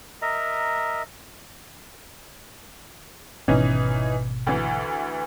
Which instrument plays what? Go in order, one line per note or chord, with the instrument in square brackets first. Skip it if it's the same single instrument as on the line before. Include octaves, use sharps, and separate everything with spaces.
[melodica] A#4 D#5 E5 A#5
[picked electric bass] G#1 B2 [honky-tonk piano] E3 C#4 D#4
[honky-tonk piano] D2 E3